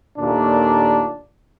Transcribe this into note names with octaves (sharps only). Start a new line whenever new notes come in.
D#2 A#2 A3 D4